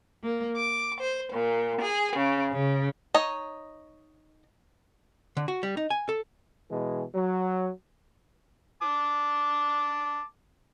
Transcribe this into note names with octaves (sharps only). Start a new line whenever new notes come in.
A#3
D6
C5
A#2
G#4
C#3
C#3
D#4 C#5 D#5
D3
F#4
G3
D#4
G#5
A4
B2 E3 G#3
F#3
A5 D6